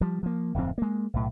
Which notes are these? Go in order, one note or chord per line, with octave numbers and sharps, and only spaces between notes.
F3 G3
F3 A#3
D1 F2 G#2 C4
G#3 A#3
B1 A2